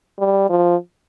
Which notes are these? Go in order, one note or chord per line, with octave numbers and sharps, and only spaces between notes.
G3
F3